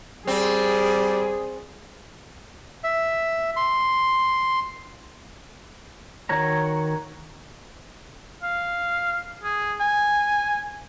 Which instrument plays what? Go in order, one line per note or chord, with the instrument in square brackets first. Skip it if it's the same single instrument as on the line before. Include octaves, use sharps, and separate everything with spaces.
[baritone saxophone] G3 [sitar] C4 [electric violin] G#4
[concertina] E5
C6
[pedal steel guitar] D#3 F#4 C#5 A#5
[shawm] F5
G#4
G#5